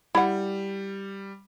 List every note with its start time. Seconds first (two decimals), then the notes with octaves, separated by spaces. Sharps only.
0.15 G3 E4 F#5